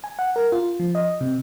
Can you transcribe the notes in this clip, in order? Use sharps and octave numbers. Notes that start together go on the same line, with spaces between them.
G#5
F#5
A#4
F4
F3
D#5
C3